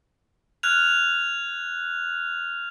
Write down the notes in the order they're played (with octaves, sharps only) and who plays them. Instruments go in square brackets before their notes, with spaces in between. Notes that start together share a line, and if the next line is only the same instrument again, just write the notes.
[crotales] F6 F#6 G#6 F7